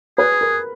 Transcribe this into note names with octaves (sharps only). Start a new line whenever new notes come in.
G#4 B4
A#4